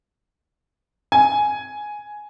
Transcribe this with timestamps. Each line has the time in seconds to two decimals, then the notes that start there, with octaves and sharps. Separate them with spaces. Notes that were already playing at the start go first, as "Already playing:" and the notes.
1.12 G#5